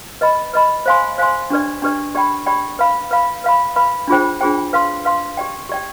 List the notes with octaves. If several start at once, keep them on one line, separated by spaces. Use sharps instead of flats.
B4 D#5 B5
B4 D#5 B5
C5 F5 G#5 C6
C5 F5 G#5 C6
D4 G4 B4 D5
D4 G4 B4 D5
G4 D5 G5 B5
G4 D5 G5 B5
B4 F5 B5
B4 F5 B5
B4 F5 B5
B4 F5 B5
D4 F4 G#4 C5 G5
D4 F4 G#4 C5 G5
B4 F5 C6
B4 F5 C6
G4 D5 G5
G4 D5 G5